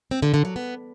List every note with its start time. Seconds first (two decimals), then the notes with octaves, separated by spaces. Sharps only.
0.11 C4
0.22 D3
0.34 D3
0.45 F#3
0.56 B3